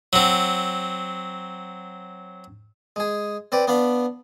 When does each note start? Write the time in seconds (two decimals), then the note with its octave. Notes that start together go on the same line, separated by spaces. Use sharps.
0.13 F#3 C4
2.96 G#3 G#4
3.52 C4 B4 D5
3.67 B3 D4 F5 B5